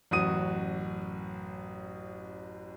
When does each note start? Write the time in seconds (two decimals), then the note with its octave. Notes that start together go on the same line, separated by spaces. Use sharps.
0.11 A1 F#2 F#4 D#6 D#7